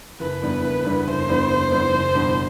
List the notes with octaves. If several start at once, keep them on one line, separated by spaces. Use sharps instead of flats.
F#1 B4
E2 D3 G3 B3
F#1
E2 D3 G3 B3
F#1 C5
E2 D3 G3 B3
F#1
E2 D3 G3 B3
F#1
E2 B2 G3 D4